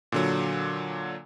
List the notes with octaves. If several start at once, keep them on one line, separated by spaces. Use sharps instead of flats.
A#2 D3 F#3